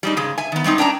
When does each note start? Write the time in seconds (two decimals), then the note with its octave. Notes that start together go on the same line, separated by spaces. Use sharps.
0.03 G3 G#3 D#4
0.17 G#2 C#3 G#3
0.38 E5 G#5
0.52 D#3 B3
0.64 G3 G#3 C4 D#4
0.78 C#4 D4 G5 A5 A#5